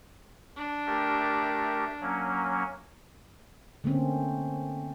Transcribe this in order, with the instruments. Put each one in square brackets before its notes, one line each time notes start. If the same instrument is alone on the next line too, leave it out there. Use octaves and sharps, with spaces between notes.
[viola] D4
[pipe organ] A3 G4 A#4
F#3 A#3 C#4
[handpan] D3 A3 A#3 C4 C#4